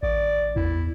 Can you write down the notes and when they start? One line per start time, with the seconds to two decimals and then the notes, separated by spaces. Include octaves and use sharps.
0.03 A1 D5
0.56 E2 E4